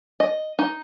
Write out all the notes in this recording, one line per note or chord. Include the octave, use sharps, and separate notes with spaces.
D#5
D#4